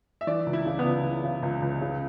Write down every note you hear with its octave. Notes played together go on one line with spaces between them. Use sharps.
E5
E3 D5
C#2
E4
C#3
B3
C#2
E3
C#3
C#2
C#2
C#3